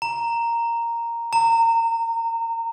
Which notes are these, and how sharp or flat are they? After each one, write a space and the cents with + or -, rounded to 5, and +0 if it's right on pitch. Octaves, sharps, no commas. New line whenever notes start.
A#5 -5
A#5 -25